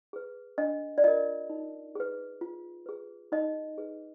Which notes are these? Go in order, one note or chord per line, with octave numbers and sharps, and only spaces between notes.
G#4 B4
D4 D#5
D5
F4 A#4 D#5
D#4
G#4 B4
F4
G#4 B4
D#4 D#5
G#4 B4